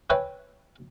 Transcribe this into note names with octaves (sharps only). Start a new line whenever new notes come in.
B4 C#5 E5 G5 G#5 B5